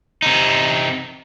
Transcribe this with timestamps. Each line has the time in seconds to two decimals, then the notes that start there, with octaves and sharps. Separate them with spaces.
0.22 C3 D#4